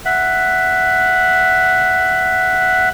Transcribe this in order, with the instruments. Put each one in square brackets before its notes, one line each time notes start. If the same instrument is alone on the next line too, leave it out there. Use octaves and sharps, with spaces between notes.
[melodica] E5 F#5